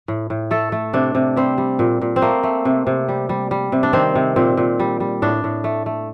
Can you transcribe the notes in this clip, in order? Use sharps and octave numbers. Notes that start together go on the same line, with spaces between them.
A2
A2
A3 A4
A3
C3 D4
C3
G3 C4
G3
A#2
A#2
C4
A3 A#3
A3
C3
C3
G3
G3
G3
C3
D4
D#3 C4
C3
A#2 C4
A#2
G3
G3
A2 D4
A2
A3
A3